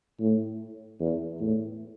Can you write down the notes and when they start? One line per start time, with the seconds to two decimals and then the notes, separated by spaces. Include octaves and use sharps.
0.20 A2
1.00 E2
1.41 A2